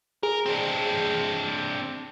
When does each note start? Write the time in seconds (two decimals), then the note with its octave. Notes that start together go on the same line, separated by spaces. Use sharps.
0.23 G#4 A#4
0.46 C4 D4